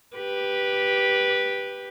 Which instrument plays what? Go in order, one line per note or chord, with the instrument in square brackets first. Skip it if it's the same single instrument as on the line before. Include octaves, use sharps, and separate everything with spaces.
[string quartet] G4 B4